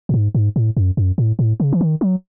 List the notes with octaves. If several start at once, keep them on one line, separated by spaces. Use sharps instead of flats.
A2
G#2
G#2
A2
F#2
F#2
A2
A2
C#3
E3
D#3
F#3